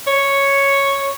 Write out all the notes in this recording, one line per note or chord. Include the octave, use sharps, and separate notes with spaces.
C#5